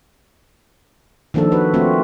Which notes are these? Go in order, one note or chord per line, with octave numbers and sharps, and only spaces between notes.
D#3 F3 A#3 D4 A4
F#4 B4
A3 C4 F4 F#4